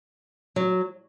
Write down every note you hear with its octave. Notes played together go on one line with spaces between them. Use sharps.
F#3